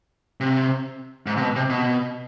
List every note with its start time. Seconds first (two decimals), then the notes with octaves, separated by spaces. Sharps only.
0.40 C3
1.26 G#2
1.37 C3
1.41 B2
1.56 C3
1.70 B2